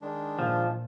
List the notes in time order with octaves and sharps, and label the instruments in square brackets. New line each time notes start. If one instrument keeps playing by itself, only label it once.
[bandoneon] D#3 G#3 D4
[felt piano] A#2 [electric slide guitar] F3